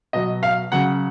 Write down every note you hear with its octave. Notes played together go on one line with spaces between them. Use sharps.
B2 F#3 D#5
F5
C#3 F#3 F#5